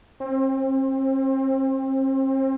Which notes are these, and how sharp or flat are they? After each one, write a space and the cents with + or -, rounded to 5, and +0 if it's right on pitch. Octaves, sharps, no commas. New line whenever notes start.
C4 +30